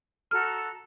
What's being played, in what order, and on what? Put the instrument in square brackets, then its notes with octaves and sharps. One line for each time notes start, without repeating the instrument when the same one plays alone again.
[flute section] F#4 A4 A#5 [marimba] F6